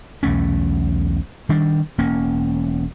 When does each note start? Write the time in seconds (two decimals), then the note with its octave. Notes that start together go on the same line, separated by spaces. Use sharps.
0.23 B1 E2 A3 C#4
1.49 D#3 G3 D4
1.98 E1 A#3 C#4